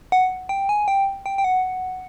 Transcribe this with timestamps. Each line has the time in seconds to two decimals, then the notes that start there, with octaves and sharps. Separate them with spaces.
0.12 F#5
0.49 G5
0.69 G#5
0.88 G5
1.26 G5
1.38 G5
1.44 F#5